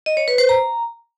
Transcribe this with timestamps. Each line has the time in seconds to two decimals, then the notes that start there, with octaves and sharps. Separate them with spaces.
0.06 D#5
0.17 C#5
0.28 B4
0.38 C5
0.49 A#5